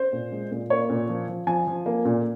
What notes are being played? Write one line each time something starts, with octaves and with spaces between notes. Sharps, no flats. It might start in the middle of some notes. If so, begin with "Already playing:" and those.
Already playing: C5
A#2
G#3
A#2
A#3 C#5
A#2
F3
F3
F3 G#5
F3
A#3
A#2